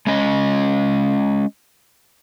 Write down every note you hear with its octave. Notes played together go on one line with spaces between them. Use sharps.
G#3 C#4 D#5